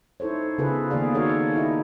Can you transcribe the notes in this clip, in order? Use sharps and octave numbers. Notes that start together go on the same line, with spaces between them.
D#4 E4 A4 C5 C#5
C#3 B3 F4 G#4 A4 B4
D#3 A#3 B3 G#4 D5 F5
D#4 F#4 A4 A#4 C#5 F5
D#4 E4 D#5